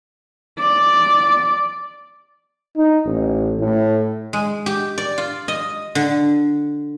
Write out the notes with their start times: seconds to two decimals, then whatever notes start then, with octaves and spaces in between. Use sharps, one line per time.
0.60 D5
2.76 D#4
3.05 A1
3.59 A2
4.33 G#3
4.66 G4
4.98 D5
5.18 F4
5.48 D#5
5.95 D3